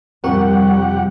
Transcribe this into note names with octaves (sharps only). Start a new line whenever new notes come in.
F2 C3 G3 C4 G4 A#4 F#5 C#6